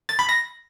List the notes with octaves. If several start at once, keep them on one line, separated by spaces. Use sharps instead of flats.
A6
B5
A#6